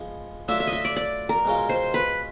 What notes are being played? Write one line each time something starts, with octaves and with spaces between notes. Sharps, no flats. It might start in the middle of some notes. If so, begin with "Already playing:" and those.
Already playing: F3 G#3 B3
F#3 A3 D4 F4 E5
E5
D#5
E5
D5
D5
A#4
B2 G#3 C#4 F4
C5
B4